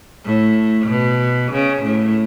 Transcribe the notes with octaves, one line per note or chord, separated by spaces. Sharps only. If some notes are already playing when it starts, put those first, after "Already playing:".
A2
B2
C#3
A2